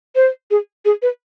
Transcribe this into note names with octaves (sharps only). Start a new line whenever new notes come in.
C5
G#4
G#4
B4